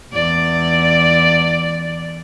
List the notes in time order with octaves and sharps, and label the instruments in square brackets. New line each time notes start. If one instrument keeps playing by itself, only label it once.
[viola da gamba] E2 D5